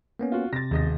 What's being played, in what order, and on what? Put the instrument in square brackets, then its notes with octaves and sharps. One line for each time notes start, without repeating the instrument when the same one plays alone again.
[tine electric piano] A#3 B3 C#4
[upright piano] F4 F#4
[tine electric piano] C3 [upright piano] A6 A#6
[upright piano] E1 D#5 A#6 [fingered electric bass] D#2